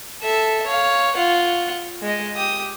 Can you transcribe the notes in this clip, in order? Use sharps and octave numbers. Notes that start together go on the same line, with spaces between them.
A4 E5
C#5 F5
F4 F#5
G#3 D#5
G4 D#6